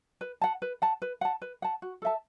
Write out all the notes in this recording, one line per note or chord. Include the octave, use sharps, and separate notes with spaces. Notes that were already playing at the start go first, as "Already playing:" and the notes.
B4
F#5 A5
B4
F#5 A5
B4
F#5 A5
B4
F#5 A5
F#4
A4 E5 A5